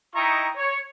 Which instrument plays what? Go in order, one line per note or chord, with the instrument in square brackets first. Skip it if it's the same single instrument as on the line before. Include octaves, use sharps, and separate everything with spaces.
[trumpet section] D#4 E4 D#5 G5 A#5 C#6
C#5